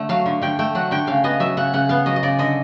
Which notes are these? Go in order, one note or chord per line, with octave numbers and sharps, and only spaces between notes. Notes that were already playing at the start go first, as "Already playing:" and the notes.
Already playing: D3 A3
F#3 F5
D3
D3 G5
A3 G5
F#3 F#5
D3 G5
C#3 F5
B3 D#5
F#3 E5
C#3 F#5
C#3 F#5
B3 F5
F#3 D#5
D#5
C#3 D5
D3 D#5